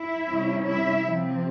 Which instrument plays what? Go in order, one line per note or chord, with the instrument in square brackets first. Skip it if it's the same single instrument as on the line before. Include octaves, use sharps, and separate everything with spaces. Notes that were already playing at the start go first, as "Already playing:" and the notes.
Already playing: [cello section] E4 E5
C3 G3 C#4
E4 E5
C3 F3 C4